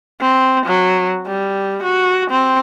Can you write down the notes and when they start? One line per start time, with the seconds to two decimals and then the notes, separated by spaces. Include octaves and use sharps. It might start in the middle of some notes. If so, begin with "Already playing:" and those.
0.21 C4
0.66 F#3
1.27 G3
1.83 F#4
2.31 C4